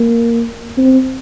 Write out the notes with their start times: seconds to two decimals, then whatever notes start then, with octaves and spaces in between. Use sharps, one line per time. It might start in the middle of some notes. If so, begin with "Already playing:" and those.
Already playing: A#3
0.78 C4